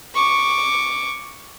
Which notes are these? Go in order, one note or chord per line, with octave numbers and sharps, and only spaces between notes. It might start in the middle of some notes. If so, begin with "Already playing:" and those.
C#6 D6